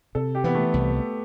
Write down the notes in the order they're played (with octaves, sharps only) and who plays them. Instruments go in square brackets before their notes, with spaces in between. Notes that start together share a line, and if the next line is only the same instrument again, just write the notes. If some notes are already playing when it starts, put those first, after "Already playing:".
[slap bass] C3 [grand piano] A4
[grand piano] G4
[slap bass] E3 [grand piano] B3
[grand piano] A3
[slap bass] C2